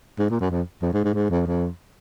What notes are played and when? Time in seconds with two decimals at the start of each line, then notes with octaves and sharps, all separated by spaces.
0.19 G#2
0.30 A#2
0.40 F#2
0.50 F2
0.82 F2
0.93 G#2
1.04 G#2
1.14 G#2
1.30 F2
1.46 F2